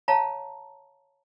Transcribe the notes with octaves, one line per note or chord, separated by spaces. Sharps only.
C#5 F5 A5 A#5